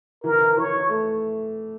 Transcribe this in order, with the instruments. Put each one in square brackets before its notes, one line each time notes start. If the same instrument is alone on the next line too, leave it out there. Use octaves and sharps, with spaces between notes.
[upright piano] E3 [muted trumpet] A#4
[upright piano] E3
[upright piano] E3 [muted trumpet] C#5
[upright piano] E3
A3